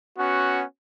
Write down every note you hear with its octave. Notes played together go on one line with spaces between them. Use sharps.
B3 C#4 F#4